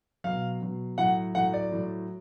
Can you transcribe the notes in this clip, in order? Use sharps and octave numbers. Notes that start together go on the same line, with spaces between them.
B2 F#3 F5
B2 F#3
A2 F#3 F#5
A2 F#3 F#5
D5
A2 F#3